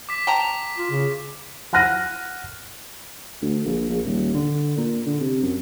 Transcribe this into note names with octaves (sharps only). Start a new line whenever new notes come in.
D6 B6
G5 A5 A#5 D6
F4
C#3
F#5 F6 F#6 A#6 D#7
D2
A#1
A#1
D#1
D3
A#2
D3
C3
F#2